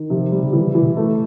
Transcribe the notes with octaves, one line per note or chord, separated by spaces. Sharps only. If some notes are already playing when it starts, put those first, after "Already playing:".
Already playing: D#3
C3 F3
G3
C#3
D3 E3
C#3
E3
B2
A3